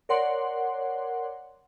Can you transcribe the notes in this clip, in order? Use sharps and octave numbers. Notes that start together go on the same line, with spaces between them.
A#4 C#5 D5 F#5 C6